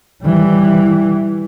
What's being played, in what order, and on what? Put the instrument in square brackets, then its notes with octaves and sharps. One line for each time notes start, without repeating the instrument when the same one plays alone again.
[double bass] E3 G3